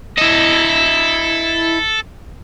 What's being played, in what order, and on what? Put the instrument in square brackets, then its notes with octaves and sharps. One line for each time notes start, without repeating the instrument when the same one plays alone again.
[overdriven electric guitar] E4 D#5 [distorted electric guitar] A4